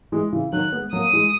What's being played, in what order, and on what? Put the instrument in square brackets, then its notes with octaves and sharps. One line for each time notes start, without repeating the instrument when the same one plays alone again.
[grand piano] E3 G#3
C#3 E3
[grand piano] D#3 F#3 [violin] F#6
[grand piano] G#3 B3
[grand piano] F#3 A#3 [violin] D#6
[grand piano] E3 G#3